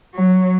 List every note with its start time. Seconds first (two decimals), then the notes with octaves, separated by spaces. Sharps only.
0.15 F#3